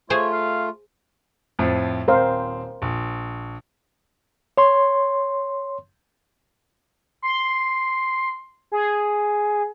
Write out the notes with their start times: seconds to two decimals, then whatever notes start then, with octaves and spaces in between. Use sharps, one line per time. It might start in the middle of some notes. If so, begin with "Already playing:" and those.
0.10 A3 F4 G#4 C5 C#5 G#5
0.32 F5
1.59 F2 A2 F3
2.08 D#1 C4 A#4 C5 F5
2.82 A#1
4.58 C#5 C6
7.22 C6
8.72 G#4